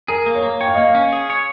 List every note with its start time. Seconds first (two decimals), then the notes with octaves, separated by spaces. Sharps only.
0.08 G#4 A#4
0.26 A#3
0.35 C#5
0.43 A#3
0.61 C#5 G5
0.67 F5
0.74 D#5
0.78 A#3 F5
0.95 C#4
1.13 G#4
1.30 C#5